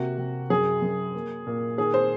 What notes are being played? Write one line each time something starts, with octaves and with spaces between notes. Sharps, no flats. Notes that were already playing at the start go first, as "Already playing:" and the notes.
Already playing: C3 A#3 F#4
C3
F#2 G#4
F#2
A#3
A#2
D#3 G#4
C5